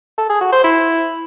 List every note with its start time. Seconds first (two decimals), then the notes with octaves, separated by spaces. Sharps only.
0.18 A4
0.29 G#4
0.41 F#4
0.53 C5
0.64 E4